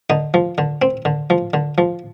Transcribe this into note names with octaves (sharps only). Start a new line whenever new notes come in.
D3 D#4
F3
D3
C4
D3
F3
D3
F3